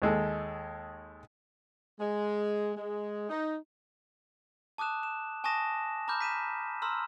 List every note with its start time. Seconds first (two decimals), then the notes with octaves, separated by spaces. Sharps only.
0.02 D#2 G#3 A4
2.00 G#3
2.76 G#3
3.30 D#4
4.78 A5 D6 D#6 F#6 E7
5.03 E7
5.44 G#5 A5 C#6 D#6 A#6 E7
6.08 A#5 B5 D6 F6 G6
6.21 B6 D#7 E7
6.82 A#5 C6 E6 F6